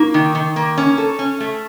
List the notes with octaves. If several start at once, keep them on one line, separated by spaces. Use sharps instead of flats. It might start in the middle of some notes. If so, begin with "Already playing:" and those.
Already playing: A#3 D#4
D#3
D#3
A#3
C#4
A4
C#4
A3